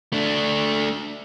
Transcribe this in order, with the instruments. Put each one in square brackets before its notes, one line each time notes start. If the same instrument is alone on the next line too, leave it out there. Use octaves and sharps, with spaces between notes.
[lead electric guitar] A3 D4